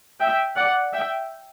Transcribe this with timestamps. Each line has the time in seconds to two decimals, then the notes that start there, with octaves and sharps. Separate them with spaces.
0.21 E5 G5
0.57 D5 F#5
0.93 E5 G5